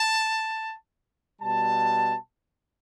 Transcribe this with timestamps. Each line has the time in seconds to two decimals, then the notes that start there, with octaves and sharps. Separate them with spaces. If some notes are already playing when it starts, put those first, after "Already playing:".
Already playing: A5
1.40 B2 G3 A5